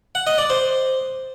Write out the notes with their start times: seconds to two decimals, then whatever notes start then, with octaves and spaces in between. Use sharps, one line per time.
0.15 F#5
0.27 D#5
0.38 D5
0.50 C5